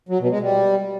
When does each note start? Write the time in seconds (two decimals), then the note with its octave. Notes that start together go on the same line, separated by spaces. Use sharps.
0.09 F#3
0.20 B2
0.31 G#3
0.42 G3